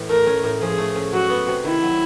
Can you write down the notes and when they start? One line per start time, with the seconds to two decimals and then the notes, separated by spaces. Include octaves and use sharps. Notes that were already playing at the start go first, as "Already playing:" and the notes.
Already playing: A2 E3
0.09 A3 A#4
0.27 C#4
0.43 A2
0.60 F3 G#4
0.78 A3
0.96 C#4
1.13 F#3 F#4
1.30 B3
1.48 C3
1.64 D#3 E4
1.82 F#3